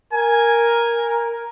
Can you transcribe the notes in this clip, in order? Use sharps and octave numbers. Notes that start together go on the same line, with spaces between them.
A#4 G#5